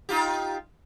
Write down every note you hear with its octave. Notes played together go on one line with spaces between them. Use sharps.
D#4 F4 G4